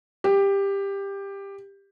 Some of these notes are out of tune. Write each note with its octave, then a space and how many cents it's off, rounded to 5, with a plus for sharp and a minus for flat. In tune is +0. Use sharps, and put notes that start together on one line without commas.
G4 +15